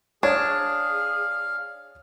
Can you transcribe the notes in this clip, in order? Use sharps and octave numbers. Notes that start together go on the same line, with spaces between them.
D4 G#4 C#5 F5 G#6